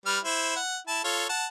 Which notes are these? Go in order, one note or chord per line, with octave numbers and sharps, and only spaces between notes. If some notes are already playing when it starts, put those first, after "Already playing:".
G3 B4 F6
E4 C5
F#5
E4 A5
F4 A4 C#5
F#5 A5